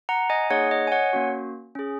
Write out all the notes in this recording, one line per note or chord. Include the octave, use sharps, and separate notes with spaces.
F#5 A#5
D#5 G#5
A#3 D#4 G#4 C#5 F#5
D#5
G#5
C#5 F#5
A#3 C#4 F#4
C#4 G#4